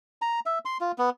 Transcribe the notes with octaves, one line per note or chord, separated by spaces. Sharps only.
A#5
E5
C6
F4
B3